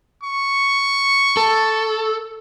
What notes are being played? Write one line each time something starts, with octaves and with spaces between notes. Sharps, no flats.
C#6
A4